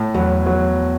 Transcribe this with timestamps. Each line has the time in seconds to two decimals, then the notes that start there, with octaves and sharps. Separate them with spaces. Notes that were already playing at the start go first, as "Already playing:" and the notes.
Already playing: A2
0.14 E2 F#3
0.46 F#3